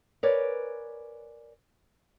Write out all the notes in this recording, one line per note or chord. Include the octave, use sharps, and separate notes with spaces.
A#4 B4 C#5 D5 G#5